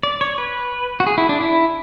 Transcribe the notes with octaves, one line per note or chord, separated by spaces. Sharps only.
D5
C#5
B4
F#4
G#4
E4
D4
E4